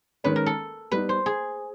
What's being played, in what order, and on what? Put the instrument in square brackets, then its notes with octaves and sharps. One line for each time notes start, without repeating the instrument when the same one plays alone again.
[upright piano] D#3 G#3 C#4 [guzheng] B4
[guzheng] A#4
A4
[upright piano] G3 B3 D#4 [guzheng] B4
[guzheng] C5
G#4